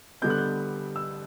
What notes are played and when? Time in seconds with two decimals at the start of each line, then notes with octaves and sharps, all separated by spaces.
0.22 D3 G3 B3 G6
0.30 F#6
0.38 G6
0.96 E6